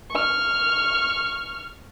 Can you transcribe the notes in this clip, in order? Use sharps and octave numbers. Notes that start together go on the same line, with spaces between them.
C#6 F6